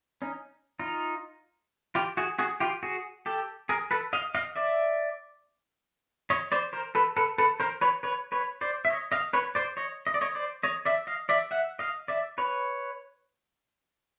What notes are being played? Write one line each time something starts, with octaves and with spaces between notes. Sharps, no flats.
C#4 D#4
D#4 F4
F4 G4
F#4 G#4
F#4 G#4
F4 G4
F#4 G#4
G4 A4
G#4 A#4
A4 B4
D#5 F5
D#5 F5
D5 E5
C#5 D#5
C5 D5
A#4 C5
A4 B4
A4 B4
A4 B4
A#4 C5
B4 C#5
B4 C#5
B4 C#5
C5 D5
E5
C#5 D#5
D#5 F5
B4 C#5
C5 D5
C#5 D#5
D#5
D5
C#5 D#5
C5 D5
C#5 D#5
D5 E5
D#5 F5
D5 E5
E5 F#5
D#5 F5
D5 E5
B4 C#5